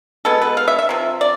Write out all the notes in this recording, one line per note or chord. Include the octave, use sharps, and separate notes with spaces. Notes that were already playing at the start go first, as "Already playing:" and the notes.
B2 G#3 B3 A4
B4
F5
E5
E5
C3 F3
D5